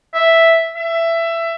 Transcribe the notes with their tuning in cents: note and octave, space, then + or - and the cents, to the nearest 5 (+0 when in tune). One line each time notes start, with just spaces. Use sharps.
E5 +0
E5 +15